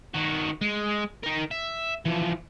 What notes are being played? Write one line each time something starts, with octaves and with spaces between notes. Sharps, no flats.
D#3 F#4
G#3
D#4 A#4
E5
E3 F3